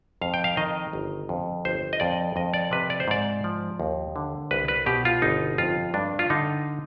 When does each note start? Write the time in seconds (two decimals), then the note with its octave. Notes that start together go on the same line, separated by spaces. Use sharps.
0.21 F2 F5
0.34 G5
0.44 F5
0.57 D#3 D#5
0.93 G1
1.29 F2
1.65 G1 C5
1.93 D#5
2.00 F2 D5
2.36 F2 D#5
2.54 D5
2.71 C3 B4
2.90 D5
3.00 C5
3.08 G#2 D5
3.44 F3
3.80 D#2
4.16 D3
4.51 C2 B4
4.68 B4
4.86 B2 G4
5.05 F4
5.22 G1 D#4
5.58 F2 F4
5.94 G2 D4
6.19 F4
6.30 D3 D#4